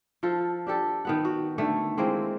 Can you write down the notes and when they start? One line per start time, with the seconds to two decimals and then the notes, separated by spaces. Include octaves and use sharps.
0.23 F3 F4 A4
0.67 D4 G4 A4
1.05 D#3 B3 F#5
1.25 F#4
1.58 D3 D#3 A3
1.98 E3 G#3 A#3 C4